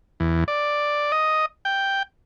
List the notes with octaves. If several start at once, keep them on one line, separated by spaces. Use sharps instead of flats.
E2
D5
D#5
G5